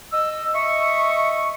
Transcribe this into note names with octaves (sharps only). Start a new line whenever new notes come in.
D#5 E6
D#5 E5 C#6